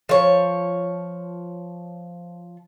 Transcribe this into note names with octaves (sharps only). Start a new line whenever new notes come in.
F3 C#5